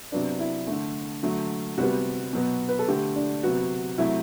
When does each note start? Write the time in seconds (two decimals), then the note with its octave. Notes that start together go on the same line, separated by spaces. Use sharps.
0.12 C3 F#3 B3 D4
0.39 E4
0.67 D3 A3
1.23 D3 F#3 A3
1.78 C3 G3 B3 F#4
2.33 B2 F#3 B3
2.69 B4
2.79 A4
2.88 D3 A3 G4
3.16 D4
3.43 C3 F#3 B3 F#4
3.98 C3 F#3 A3 E4